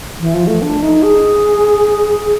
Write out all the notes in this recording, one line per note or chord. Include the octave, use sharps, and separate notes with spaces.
E3
F3
A3
D4
D#4
G#4